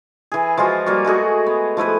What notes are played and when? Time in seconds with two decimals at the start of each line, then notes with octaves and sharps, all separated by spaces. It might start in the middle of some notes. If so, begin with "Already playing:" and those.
0.32 E3 G#4
0.57 F3 G#3 F4 F#4
0.86 G3 A#3 F4 F#4
1.05 G#3 A3 F#4 G#4
1.46 B3
1.77 F3 A3 E4 B4